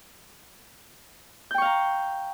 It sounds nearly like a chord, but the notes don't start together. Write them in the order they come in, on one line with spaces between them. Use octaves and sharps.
G6 G5 C#6 F5 A#5